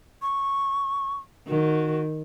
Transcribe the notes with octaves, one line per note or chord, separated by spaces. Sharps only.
C#6
D#3 F#4